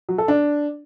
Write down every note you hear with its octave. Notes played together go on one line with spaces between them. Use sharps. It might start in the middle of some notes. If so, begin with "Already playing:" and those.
F#3
A4
D4